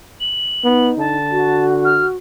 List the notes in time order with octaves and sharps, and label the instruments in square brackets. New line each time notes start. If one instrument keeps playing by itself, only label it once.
[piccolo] F#7
[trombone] B3 [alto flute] D#4
[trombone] D3 [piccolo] A5
[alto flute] F#4
[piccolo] F6